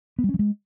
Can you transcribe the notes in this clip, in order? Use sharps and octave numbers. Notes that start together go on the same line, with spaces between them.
B3
G3
C#4
F#3
G#3